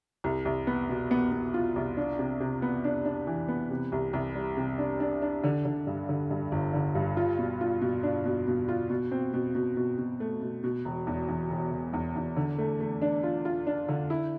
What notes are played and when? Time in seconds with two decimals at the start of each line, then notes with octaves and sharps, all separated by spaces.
0.24 C2
0.45 C2
0.67 B3
0.89 B2
1.11 B3
1.32 B3
1.54 F4
1.76 C2
1.97 D4
2.19 C3
2.40 C3
2.62 B3
2.84 D4
3.05 D4
3.27 E3
3.48 B3
3.71 C3
3.92 C2
4.13 C2
4.35 G3
4.57 C3
4.78 D4
5.00 D4
5.22 D4
5.44 D3
5.65 D3
5.87 G2
6.09 D3
6.31 G2
6.52 G1
6.74 D3
6.95 G2
7.17 F4
7.39 B2
7.61 F4
7.82 B2
8.03 D4
8.25 B2
8.47 B2
8.68 F4
8.90 B2
9.11 C4
9.34 B2
9.55 B2
9.77 B2
9.98 B2
10.20 A3
10.42 B2
10.64 B2
10.85 E1
11.07 E2
11.28 E2
11.50 E1
11.72 E1
11.93 E2
12.16 E2
12.37 D3
12.59 A3
12.80 A3
13.02 D4
13.23 F4
13.45 F4
13.67 D4
13.89 D3
14.10 E4